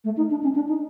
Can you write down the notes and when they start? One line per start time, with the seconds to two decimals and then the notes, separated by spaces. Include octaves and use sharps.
0.04 A3
0.17 D#4
0.31 D4
0.43 C#4
0.55 D4
0.68 D#4